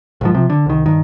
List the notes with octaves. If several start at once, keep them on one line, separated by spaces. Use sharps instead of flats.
A#1 G#2 F3
C3 F3
D3
C2 D#3
G2 D#3